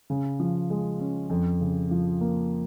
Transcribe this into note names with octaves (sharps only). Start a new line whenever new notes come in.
C#3
F3
G#3
C#4
F2
C#3
F3
A#3